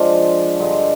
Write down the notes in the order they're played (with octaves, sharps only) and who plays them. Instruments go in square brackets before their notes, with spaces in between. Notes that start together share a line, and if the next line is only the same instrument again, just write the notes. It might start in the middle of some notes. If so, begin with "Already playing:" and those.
Already playing: [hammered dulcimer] F3 G#3 D4 F4
G2 D3 G#3